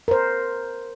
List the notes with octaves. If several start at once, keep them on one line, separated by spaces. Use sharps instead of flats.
A#4 C5